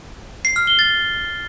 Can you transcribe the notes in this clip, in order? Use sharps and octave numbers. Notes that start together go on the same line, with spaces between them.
C7
F6
G7
A6